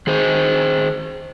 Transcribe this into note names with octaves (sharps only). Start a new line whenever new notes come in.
D#3 G#4 C5